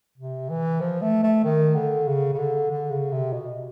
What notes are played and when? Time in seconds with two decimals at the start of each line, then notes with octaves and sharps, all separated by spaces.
0.18 C3
0.50 E3
0.81 F3
1.02 A3
1.23 A3
1.44 D#3
1.76 D3
2.08 C#3
2.34 C#3
2.39 D3
2.71 D3
2.91 C#3
3.12 C3
3.33 B2